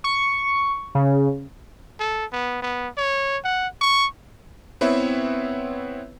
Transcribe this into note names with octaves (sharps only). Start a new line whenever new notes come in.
C#6
C#3
A4
B3
B3
C#5
F#5
C#6
B3 C4 E4 B4 C#5 E5